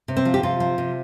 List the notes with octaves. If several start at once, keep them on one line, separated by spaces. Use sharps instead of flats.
C3
C4
F3
G4
C3 F4
F3
C3